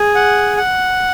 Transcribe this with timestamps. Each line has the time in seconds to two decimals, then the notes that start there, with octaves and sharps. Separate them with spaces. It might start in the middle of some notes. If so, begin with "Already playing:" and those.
Already playing: G#4
0.15 F#5
0.57 F#5